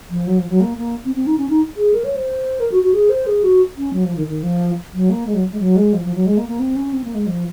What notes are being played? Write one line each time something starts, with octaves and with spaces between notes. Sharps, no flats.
F3
F#3
F3
F#3
A#3
A#3
C4
C4
D#4
C#4
D#4
G#4
A#4
C#5
C5
A#4
F#4
F#4
G#4
C5
G#4
F#4
C#4
F#3
F3
D#3
D#3
F3
F#3
A#3
G#3
F#3
G#3
F#3
G#3
F3
F3
F#3
G#3
A#3
A#3
C4
C#4
C4
A#3
G#3
F3